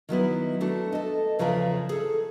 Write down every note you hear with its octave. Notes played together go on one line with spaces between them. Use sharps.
D#3 F#3 B3 E4
A3 D4 F#4
A4 D#5
E2 C#3 F3 A#4 D5 E5
G#4 A4